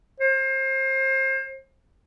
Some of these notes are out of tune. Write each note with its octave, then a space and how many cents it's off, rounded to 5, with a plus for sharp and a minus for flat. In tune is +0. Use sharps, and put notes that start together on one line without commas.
C5 +30